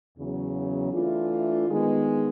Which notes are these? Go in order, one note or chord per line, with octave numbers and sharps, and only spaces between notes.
E2 C#3 F#3
E3 A3 D4 F4
D#3 G#3 B3